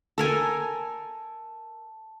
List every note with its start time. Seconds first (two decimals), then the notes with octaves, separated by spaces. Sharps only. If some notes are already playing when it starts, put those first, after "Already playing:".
0.18 A4 A#4 G#5 A5